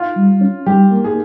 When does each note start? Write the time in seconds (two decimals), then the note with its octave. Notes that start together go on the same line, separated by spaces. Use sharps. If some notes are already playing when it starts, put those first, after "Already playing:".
Already playing: F4
0.16 G3
0.41 C#4
0.66 G3 G4
0.91 A#3
1.04 G#4